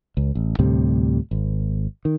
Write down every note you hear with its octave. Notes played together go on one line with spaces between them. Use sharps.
C#2
A1
D2 A2 C3 G3
G#1
D#3